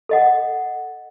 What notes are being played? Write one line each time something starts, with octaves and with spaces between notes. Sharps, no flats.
A4 D#5 F#5